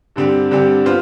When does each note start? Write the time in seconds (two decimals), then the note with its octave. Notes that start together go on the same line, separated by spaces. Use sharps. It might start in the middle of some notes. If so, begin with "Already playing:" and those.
0.16 G2 D3 G3 C4 G4
0.51 G2 D3 G3 C4 G4
0.85 G3 B3 F4 C5